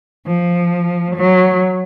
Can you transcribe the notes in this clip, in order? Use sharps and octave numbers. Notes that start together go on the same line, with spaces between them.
F3
F#3